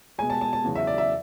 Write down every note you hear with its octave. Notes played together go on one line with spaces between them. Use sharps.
B2 G#3 G#5
A5
A5
A5
E2 C#3 F#3
E5
D5
E5